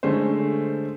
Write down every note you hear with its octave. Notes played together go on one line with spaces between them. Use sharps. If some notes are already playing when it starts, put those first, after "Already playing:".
D3 G#3 A3 C#4 C5